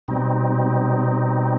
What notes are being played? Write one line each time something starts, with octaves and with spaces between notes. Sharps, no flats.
B2 G3 C4 D#4